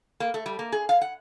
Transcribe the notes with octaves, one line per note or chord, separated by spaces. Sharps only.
A#3
A3
G3
A#3
G#4
F5
F#5